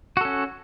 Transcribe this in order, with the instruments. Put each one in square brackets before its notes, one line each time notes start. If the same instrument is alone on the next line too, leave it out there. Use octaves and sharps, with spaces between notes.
[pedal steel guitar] F#4
A4
C#4